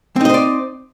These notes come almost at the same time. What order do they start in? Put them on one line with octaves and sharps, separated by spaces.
C4 D#4 D#5 C5 D5